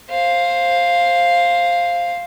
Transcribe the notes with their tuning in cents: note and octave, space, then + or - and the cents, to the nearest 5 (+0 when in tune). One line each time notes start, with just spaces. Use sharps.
C5 +15 F5 +0